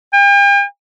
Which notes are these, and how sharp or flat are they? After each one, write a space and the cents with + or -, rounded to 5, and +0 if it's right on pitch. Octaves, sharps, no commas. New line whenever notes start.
G5 +45